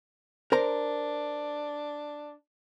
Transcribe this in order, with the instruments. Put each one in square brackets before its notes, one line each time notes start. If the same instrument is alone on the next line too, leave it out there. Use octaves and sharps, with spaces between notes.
[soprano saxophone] D4 [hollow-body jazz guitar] A#4 C5 A#5